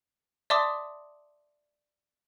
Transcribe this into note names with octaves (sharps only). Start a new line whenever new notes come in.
D5 E5 A5 C6 D6 D#6